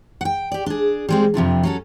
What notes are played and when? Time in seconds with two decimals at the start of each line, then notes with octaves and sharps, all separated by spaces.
0.21 F#5 G5
0.52 G4 D5
0.66 D4 G#4
1.09 G3 G#3 C4
1.34 F2 C3 F3 D4
1.63 F#3 C#4 A4